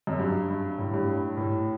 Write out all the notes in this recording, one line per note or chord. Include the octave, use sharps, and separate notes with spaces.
F#2
G2
G2
A2
G2
A2